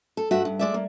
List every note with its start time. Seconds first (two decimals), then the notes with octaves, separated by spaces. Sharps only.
0.17 A4
0.31 G2 F#4 E5
0.45 G2
0.59 G#3 D5 E5
0.74 A#3